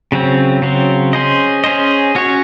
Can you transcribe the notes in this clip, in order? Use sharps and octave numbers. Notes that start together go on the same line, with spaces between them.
C#3 F#3 C4
C#3 F#3 C4
C#4 G#4 C5 D#5
C#4 G#4 C5 D#5
C#4 F#4 C#5